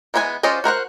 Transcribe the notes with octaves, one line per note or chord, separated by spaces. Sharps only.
E3 G#3 B3 E4 G#5
C#4 F4 C5 D5 D#5
F#4 A#4 C5 F#5